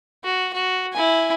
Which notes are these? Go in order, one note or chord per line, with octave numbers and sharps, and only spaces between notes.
F#4
F#4
E4 G#5